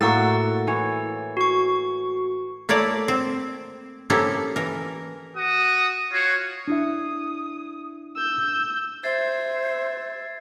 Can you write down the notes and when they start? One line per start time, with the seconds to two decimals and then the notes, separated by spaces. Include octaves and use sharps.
0.01 A2 A#3 F#4 F#5 E6 A6
0.67 E3 C#5
1.37 F#4 C#6
2.69 A3 A#3 E4 C#5 D5
3.08 C4
4.10 F3 A#3 C#4 E4 G4 A4
4.56 E3 A#4
5.37 F#4 D#6
6.12 F4 F#4 C#5
6.68 D4 E4 E5 D#6
8.16 E6 G6
9.04 C5 E5 G#6 A6 C7